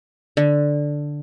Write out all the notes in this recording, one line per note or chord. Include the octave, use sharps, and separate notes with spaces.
D3